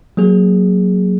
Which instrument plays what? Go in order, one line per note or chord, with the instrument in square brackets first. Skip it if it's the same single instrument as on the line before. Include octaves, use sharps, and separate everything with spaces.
[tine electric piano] F#3 A#3 G#4